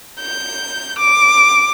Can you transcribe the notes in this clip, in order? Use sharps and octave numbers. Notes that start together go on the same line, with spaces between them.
G6
D6